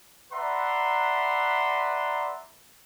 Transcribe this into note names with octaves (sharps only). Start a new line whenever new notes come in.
B4 D5 E5 F#5 A#5 C6